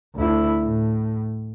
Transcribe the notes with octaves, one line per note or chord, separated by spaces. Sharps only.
D2 E4
A2